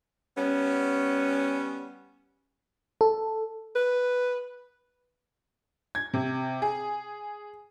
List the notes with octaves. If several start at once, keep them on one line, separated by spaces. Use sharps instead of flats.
G3 B3 C#4
A4
B4
G#6
C3
G#4